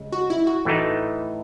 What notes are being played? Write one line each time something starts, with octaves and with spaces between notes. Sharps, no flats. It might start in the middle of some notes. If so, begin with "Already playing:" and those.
Already playing: C#3 G#3
F#4
E4
F#4
A2 E3 A3 D#4